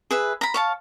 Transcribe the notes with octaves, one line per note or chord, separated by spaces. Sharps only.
G#4 B4 E5
A#5 B5
C#5 F5 A5